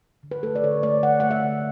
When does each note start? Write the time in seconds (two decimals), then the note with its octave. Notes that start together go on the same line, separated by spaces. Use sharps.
0.23 D3
0.31 B4
0.43 A3 A4
0.55 D5
0.63 D3 C#5
0.83 A3 D5
1.03 D3 F#5
1.20 A3 F#5
1.31 E5
1.44 D3